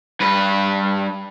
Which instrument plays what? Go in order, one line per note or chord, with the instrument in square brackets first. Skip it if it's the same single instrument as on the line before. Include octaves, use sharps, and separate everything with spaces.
[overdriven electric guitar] G2 B4